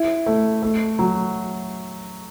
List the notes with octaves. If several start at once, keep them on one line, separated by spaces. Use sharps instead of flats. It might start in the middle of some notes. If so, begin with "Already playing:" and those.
Already playing: E4
A3
A3
F#3